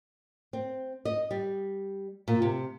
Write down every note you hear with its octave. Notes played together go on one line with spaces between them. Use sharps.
C4
D#5
G3
A#2
C3